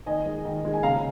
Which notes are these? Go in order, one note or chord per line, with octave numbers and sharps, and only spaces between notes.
D#3 D#5 G#5
G#3
D#3
G#3
G#5
C#3 F5 A#5